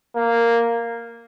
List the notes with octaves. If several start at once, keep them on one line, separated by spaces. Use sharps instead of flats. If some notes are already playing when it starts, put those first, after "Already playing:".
A#3